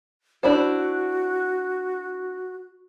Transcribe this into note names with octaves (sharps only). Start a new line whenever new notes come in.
D4 E4 F#4 C5